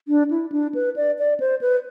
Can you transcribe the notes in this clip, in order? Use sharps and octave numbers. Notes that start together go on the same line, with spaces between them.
D4
E4
D4
B4
D5
D5
C5
B4